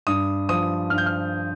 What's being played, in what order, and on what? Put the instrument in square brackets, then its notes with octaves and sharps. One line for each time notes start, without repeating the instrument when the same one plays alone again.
[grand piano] G2 D#6
F3 D#6
G2 F6
G6
F6